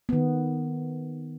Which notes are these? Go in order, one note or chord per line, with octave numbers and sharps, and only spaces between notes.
D#3 B3